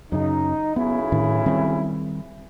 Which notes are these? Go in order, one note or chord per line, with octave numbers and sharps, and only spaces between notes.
F#2 C#3 D#4
B1 C#3 B3 E4
A2 D#3 D4
D#3 G3 C4